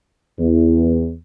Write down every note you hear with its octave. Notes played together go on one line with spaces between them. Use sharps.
E2